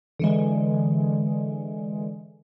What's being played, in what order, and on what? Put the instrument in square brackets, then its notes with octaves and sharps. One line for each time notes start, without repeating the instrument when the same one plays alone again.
[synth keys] D3 E3 G#3